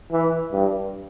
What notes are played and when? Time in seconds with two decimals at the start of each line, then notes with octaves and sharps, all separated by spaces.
0.12 E3
0.52 G2